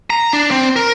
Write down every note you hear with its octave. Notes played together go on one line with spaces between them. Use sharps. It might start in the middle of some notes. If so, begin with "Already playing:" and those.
A#5
D4
C4
A#4